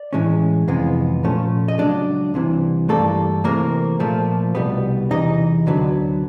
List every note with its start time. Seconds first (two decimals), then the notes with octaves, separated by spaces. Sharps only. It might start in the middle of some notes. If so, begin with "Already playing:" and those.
Already playing: D5
0.13 A2 E3 G#3 C#4
0.68 F2 C3 E3 G#3 B3
1.23 A#2 F3 A3 C#4
1.68 D#5
1.79 C#2 C#3 F#3 D4 D5
2.34 C2 C3 E3
2.89 G2 E3 G3 A3 A#3 A4
3.44 C3 E3 A3 A#3 C4 A#4
4.00 A#2 F3 A3
4.55 C2 B2 G3 B3
5.10 E2 C3 E3 D#4 D#5
5.66 D2 D3 F#3 B3